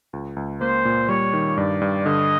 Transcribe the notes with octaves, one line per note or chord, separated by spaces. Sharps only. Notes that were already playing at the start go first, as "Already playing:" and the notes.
C#2
C#2
A#3 C5
A#2
G3 C#5
D#3
G2 D5
G2
D3 D#5